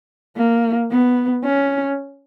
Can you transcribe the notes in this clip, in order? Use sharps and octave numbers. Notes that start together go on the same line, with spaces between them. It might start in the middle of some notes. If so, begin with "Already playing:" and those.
A#3
B3
C#4